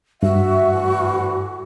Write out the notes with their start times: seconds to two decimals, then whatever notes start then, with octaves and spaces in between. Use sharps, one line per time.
0.23 G2 F#4 E5
0.71 D2 E3